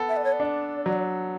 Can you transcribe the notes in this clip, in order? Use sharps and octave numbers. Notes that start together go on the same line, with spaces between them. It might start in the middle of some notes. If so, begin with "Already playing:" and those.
Already playing: B3 A4
E5
D5
C#5
D5
D4
F#3